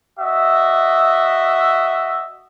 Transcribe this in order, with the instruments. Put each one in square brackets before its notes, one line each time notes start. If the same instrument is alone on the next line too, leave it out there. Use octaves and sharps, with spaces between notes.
[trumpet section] F#4 D#5 E5